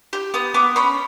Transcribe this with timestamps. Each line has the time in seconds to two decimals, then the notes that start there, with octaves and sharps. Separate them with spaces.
0.13 G4
0.34 B3 D#6
0.54 B3 D6
0.76 C#4 B5